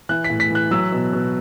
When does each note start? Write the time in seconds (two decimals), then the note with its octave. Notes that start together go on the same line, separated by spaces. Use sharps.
0.09 E3 F#6
0.24 B6
0.30 A2
0.40 B6
0.50 E3 F#6
0.71 F#3 E6
0.92 B2
1.13 B2